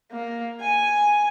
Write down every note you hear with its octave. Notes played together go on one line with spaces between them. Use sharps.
A#3
G#5